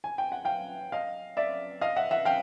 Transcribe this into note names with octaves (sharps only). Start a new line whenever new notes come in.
G#5
G5
F#5
F5 G5
D#5 F5
D5 E5
D#5 F5
E5 F#5
E5 F#5
F5 G5